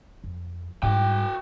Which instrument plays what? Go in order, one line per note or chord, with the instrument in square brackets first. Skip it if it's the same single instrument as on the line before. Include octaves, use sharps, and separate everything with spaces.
[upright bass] F2
[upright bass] G#2 G3 [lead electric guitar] F#4 G5